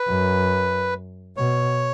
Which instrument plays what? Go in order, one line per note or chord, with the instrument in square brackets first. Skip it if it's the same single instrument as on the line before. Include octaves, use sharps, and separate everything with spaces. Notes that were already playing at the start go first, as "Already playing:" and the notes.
Already playing: [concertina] B4
[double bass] F#2
[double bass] B2 [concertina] C#5